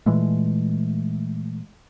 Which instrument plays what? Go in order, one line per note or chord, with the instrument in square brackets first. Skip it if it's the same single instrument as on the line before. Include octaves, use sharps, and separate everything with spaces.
[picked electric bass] A#2 E3 G#3 A3